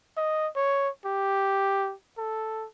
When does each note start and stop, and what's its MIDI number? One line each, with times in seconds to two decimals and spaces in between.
0.17 0.47 75
0.56 0.89 73
1.05 1.93 67
2.18 2.66 69